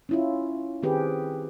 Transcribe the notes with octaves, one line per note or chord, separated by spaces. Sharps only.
C#4 E4 F4
D#3 C4 G4 G#4 B4